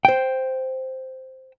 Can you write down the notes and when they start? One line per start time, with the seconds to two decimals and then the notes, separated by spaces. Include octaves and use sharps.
0.05 C5 G5